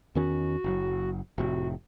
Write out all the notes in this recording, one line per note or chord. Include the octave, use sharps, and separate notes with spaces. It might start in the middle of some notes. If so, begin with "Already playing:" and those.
E2 D#3 C#4 F#4
F#1 F#3
F1 A2 C3 F#4